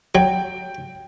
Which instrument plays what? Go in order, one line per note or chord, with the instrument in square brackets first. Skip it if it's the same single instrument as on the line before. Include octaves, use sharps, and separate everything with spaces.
[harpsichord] F#3 [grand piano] G5